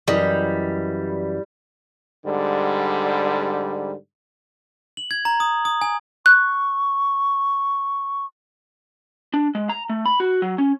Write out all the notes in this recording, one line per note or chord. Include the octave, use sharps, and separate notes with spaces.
F#2 E3 G3 D#5
G#2 D3 G3
F#7
G#6
A#5
D#6
D#6
G#5
C#6 F#6
D4
G#3
A#5
A3
B5
F#4
F#3
C#4